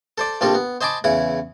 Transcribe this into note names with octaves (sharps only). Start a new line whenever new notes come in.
A4 C5 D5
A#1 F3 G3 C4 A4
B3
C5 D#5 G#5 A5 B5 D6
E2 C#3 E4 B5